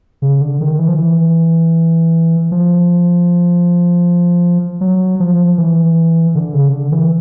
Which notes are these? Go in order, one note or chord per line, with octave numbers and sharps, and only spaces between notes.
C#3
D3
D#3
E3
F3
E3
F3
F#3
F3
E3
D3
C#3
D3
E3